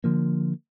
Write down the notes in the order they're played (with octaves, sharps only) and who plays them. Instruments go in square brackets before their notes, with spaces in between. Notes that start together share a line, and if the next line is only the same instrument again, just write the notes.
[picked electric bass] D3 F3 A#3